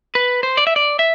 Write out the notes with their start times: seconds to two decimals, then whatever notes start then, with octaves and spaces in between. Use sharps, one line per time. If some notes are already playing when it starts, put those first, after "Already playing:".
0.15 B4
0.43 C5
0.57 D5
0.67 E5
0.76 D5
0.99 E5